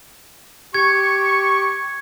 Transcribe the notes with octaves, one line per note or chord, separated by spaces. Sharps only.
G4 C#6 G#6